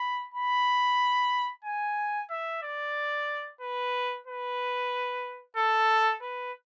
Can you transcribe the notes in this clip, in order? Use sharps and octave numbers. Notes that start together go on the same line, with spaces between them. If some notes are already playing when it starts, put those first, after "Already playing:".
Already playing: B5
B5
G#5
E5
D5
B4
B4
A4
B4